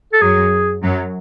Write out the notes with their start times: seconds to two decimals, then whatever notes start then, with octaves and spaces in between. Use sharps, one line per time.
0.13 A4
0.21 F#2 F#3 G#4
0.83 F#2 F#3